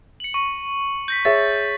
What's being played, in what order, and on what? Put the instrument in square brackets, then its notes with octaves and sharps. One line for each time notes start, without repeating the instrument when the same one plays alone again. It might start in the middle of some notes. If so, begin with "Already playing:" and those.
[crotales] C#7 F#7
C#6
G6 A#6 B6
[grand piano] G#4 C#5 E5 [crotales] A6